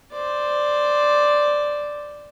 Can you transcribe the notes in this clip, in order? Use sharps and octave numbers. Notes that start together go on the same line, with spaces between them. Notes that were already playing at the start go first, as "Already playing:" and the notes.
C5 D5